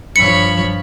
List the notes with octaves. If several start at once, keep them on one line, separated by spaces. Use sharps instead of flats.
G2 F3 C#5 B5 C#7